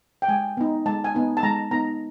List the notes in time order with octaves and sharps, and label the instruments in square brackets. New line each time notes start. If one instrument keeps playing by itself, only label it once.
[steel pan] G5
G#3 G#5
B3 D#4
G#3 A5
G#5
B3 D#4
A5
G#3 A#5
B3 D#4 A#5